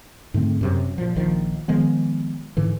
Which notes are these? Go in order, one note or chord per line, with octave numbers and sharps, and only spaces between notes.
G#2 D3 A3 C4
F#2 C3 F#3
A#2 F3
A#1 D#3 F3
D#3 F3 G#3 B3
G#2 D3 E3